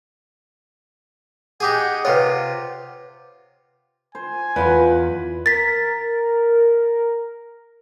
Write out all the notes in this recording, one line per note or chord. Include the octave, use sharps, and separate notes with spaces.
D#4 G4 G#4 F#5
C3 F4 B4 C#5
C5 G#5
E2 F4 B4 F#5 B5
A#4 A6 B6